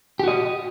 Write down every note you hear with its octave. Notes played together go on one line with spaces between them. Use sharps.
F#4 G4 D#5